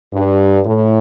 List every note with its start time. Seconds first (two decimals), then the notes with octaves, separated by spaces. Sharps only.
0.13 G2
0.66 A2